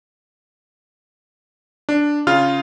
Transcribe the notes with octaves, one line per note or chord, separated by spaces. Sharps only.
D4
C#3 F4 F6